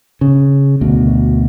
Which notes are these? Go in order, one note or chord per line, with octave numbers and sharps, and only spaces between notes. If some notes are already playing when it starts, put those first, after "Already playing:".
C#3
D2 B2